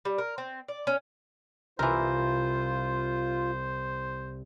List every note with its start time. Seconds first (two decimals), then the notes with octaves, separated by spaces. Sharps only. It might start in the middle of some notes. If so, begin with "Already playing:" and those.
0.05 G3
0.18 A#4
0.38 C4
0.68 D5
0.87 C#4
1.79 C2 E3 F4 A#4 C5